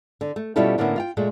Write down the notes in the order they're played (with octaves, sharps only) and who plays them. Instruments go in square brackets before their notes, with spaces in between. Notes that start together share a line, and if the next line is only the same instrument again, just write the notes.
[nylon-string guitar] D3
A3
B2 G3 C#4 E4 F4 A4
A2 D3 A#3 B3 C#4 E4
F4 F5 G5
A#2 G#3 A3